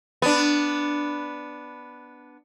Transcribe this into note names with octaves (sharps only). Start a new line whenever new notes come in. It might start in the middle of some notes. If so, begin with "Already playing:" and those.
B3 D4